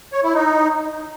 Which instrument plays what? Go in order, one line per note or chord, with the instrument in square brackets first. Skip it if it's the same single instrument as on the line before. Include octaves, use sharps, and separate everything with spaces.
[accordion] C#5
E4
D#4